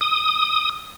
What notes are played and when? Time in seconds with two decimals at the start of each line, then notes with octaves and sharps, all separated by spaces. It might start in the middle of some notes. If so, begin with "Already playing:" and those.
0.01 D#6